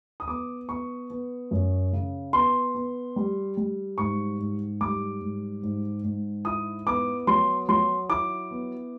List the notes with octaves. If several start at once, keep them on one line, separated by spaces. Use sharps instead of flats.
D#6
B3 D6
B3 C#6
B3
F#2
C#3
B3 C6
B3
G3
G3
G#2 C#6
G#2
G3 D6
G#2
G#2
G#2
E4 D#6
B3 D6
F#3 C6
F#3 C6
E4 D6
B3